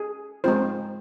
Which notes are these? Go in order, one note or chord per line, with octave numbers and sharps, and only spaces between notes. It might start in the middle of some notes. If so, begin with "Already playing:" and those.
Already playing: G#4
G#3 C4 F4 C5